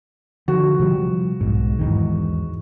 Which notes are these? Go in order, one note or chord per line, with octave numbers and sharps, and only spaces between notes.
D3 F3 F#4
C3 F3 G3
B1 G#2
E2 G#2 D#3